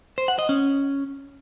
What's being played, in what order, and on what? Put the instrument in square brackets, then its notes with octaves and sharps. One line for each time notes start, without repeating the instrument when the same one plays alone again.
[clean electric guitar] C5
F#5
D#5
C#4